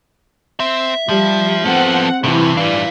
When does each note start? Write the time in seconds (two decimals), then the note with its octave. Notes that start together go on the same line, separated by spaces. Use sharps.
0.60 C4 E5
1.09 F3 G3
1.66 B3 C4 A4 F#5
2.24 G2 C3 E3
2.57 G3 D4 D5 F5